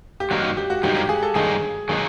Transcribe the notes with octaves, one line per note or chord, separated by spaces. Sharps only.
G4
G2 D#3 F#3 A#3 D#4 F#4
G4
F#4
G2 D#3 F#3 A#3 D#4 G4
G4
G#4
A4
G2 D#3 F#3 A#3 D#4 G#4
D#3 F#3 A#3 D#4 G#4